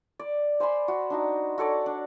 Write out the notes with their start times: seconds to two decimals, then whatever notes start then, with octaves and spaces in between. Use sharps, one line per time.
0.20 D5
0.60 C5 G#5 B5 C6
0.88 F#4
1.10 D4 D#4 F#4
1.58 F#4 A4 C#5 D5
1.86 D4